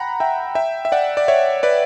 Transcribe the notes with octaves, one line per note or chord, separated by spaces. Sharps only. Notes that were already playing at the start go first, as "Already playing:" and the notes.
Already playing: F#5 G5 A#5 B5
E5 G5
E5 G5
E5
D5 F#5
D5
C#5 E5
B4 D5